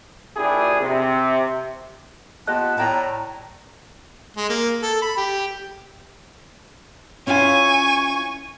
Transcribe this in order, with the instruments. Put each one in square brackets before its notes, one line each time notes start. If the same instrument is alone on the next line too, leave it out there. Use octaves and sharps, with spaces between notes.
[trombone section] A#1 D4 E4 G4 G#4
C3
[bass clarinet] B3 [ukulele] F4 G4 D#5 [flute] A5 [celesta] F#6
[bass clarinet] A2 [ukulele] D5 G5 A5 [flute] A#5
[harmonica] G#3
A#3
A4
B5
G4
[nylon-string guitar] C#4 E4 F4 [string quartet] G#5 C#6